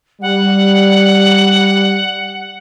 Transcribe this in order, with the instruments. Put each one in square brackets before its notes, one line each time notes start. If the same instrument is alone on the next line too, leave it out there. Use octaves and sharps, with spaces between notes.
[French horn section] G3 [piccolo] F#5